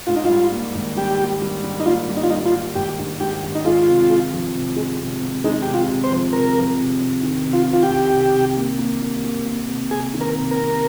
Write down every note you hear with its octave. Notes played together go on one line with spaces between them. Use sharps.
G#2 F4
D#4
G3 F4
A#3
G#1
G3 G4
A#3
G3
G3
D#4
A#3 F4
G3
D#4
F4
G3 D#4
F4
G3
G#1 G4
G#2
G#2 G4
G#1
D#4
G#3 F4
C3
G#3
F3
C3
G#3
C3
C3
G#3 D#4
C3 G4
F4
C3
C5
F3
C3 A#4
F3
C3
C3
D#3
C3
F4
C3
F4
G4
C2
C2
C3
A#3
A#3
A#3
A#3
A#3
C3
C3 G#4
D#3
A#4
C3
A#4
C3